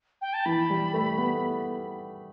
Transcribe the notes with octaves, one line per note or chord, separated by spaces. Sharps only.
G5
A5
E3 B5
G3
A3
B3